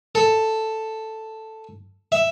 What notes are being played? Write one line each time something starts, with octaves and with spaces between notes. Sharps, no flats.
A4
E5